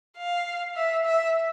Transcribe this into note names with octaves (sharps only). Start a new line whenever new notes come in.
F5
E5
E5